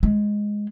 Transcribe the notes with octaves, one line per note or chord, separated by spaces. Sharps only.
G#3